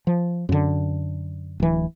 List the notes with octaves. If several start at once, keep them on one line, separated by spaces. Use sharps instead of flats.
F3
F#2 D3
D1 E3